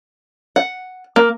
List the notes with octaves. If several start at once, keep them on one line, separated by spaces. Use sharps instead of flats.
F#5
A#3